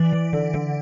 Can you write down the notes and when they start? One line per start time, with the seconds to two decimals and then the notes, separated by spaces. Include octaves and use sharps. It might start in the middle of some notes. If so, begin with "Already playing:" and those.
Already playing: E3 D5
0.13 E3
0.33 D3
0.54 D3